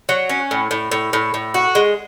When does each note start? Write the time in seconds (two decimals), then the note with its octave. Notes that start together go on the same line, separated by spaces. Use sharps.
0.09 F#3
0.29 C#4
0.51 A2
0.71 A2
0.92 A2
1.13 A2
1.34 A2
1.54 F#4
1.75 G#3